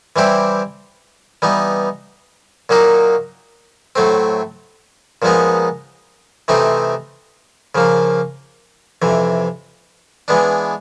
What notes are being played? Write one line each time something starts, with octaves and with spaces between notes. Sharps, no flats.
E3 G3 C4 E4 G4
E3 G3 B3 D#4
A#2 F#3 A#3 D#4 F#4
A2 F#3 A3 C4
A#2 F3 G#3 B3 D#4
C3 E3 A3 C4 D#4
C#3 F3 A#3
F2 C3 E3
E3 G#3 B3 D4